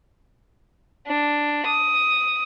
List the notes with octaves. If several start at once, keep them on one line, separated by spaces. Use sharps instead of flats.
D4
D#6